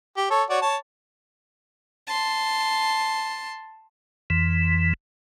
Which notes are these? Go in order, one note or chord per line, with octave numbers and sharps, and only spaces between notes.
G4
A4 C#5
F#4 C#5 D5
C#5 A5
A5 C6
F2 E3